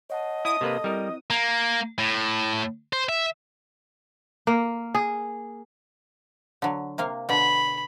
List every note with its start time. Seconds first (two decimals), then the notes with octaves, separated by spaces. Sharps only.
0.10 C#5 D#5 F#5 A5
0.45 E4 A5 D#6
0.61 C3 A#3 A4 B4
0.84 G3 C4 E4 A#4
1.30 A#3
1.98 A2
2.93 C5
3.09 E5
4.47 A#3
4.95 G#4
6.62 D3 F#3
6.98 C3 A#3 F5
7.29 B2 D3 B5